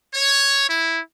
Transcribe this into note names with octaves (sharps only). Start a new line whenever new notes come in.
C#5
E4